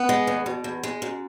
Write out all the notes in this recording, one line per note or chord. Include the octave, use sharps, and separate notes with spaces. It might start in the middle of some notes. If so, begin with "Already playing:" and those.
Already playing: B3 B4
G#3
E2
B2
E2
G#3
F#2